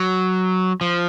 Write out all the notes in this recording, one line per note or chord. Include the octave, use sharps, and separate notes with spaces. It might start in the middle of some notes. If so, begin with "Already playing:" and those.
Already playing: F#3
F3